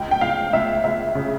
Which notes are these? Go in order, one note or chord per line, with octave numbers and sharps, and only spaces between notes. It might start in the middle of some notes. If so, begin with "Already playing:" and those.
Already playing: C#2 G5
G5
C#2 F5
C#2 E5
C#2 E5
C#3